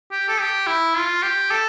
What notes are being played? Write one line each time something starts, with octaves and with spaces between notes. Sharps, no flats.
G4
A4
G4
E4
F4
G4
A4